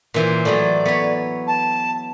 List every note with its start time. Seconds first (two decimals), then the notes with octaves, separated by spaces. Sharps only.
0.14 A#2 E3 C5
0.45 A2 E3 F#3 D5
0.86 B3 C#5
1.47 A5